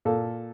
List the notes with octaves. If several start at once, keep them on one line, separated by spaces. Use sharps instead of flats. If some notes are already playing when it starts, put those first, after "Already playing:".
A#2 A4